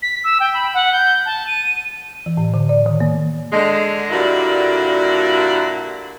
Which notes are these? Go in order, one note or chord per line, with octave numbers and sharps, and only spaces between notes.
B6
E6
G5
B5
F#5
G6
A5
D#7
E3
A2
D3
D5
D#3
A#3
D3 G#3
A#2 D3 G3 A#3 E4 F#4